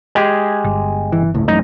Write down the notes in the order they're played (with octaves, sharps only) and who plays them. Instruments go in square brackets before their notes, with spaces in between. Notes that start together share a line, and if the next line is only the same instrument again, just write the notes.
[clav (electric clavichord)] G#3 G4 G#4
[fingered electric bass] G1
[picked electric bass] E3
C#2 A2
[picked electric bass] A1 F#2 A2 [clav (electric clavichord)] D#4